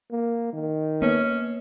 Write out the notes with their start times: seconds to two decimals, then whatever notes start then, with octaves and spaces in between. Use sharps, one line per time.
0.11 A#3
0.53 D#3
1.02 A#3 B3 C#4 B4